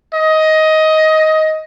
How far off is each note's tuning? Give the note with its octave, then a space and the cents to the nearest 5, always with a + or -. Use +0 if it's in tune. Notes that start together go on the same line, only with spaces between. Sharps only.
D#5 +15